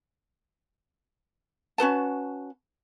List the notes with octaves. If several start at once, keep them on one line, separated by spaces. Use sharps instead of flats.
C#4 F#4 B4 A5